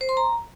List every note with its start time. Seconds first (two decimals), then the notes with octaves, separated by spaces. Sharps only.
0.01 C5
0.09 C6
0.17 A#5